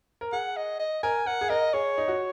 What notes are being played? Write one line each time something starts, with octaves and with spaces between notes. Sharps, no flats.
A#4
G#4 F#5
D#5
D#5
A#4 G#5
A#4 F#5
G#4
A#4 D#5
G#4 C#5
D#4
F#4